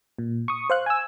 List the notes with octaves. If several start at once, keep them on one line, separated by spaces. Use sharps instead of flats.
A#2
C#6 D#6
C5 F5 F#6
G#5 E6